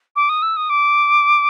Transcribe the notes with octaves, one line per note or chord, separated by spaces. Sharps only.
D6
D#6
E6
D#6
D6